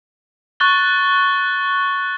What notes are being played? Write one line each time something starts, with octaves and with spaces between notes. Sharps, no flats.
C#6 F#6 A6 G7